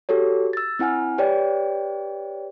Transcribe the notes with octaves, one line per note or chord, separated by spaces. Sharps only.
F#4 G4 A4 C#5
E6 A6
C4 E4 F#5 G#5 F6
G4 B4 C#5 D5 G5